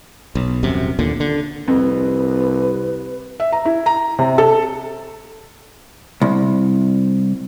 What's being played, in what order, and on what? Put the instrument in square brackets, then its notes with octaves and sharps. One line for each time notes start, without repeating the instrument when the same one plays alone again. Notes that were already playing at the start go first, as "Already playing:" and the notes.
[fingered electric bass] B1
D#1 F#2 C3
D#2 A#2 D3
D3
[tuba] C2 [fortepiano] F2 [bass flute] B4
[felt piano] E5
A#5
E4
A#5
C3
A4
[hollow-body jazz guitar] C2